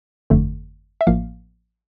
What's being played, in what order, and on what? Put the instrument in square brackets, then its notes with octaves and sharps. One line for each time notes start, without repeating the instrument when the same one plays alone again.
[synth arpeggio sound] G1 F2 D3 A3
E5
A1 A2 F3 A#3 F5